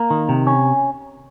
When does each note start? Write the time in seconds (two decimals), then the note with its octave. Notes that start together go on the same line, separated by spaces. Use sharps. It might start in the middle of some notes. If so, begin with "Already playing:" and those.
Already playing: A#3
0.10 D#3
0.29 C3
0.47 C#4